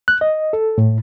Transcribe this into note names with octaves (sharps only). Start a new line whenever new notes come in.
F#6
D#5
A4
A2